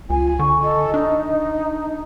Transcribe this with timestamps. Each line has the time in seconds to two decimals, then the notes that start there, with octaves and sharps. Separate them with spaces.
0.10 C#2 F4 G#5
0.39 D3 C#6
0.63 A4 D#5
0.94 D4 D#4